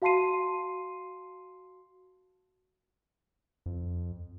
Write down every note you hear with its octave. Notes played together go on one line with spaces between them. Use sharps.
F#4 F5 A5 C6 C7 D#7
F2